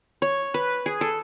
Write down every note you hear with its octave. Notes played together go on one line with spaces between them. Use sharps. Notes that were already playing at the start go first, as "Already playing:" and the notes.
C#5
B4
G#4
A4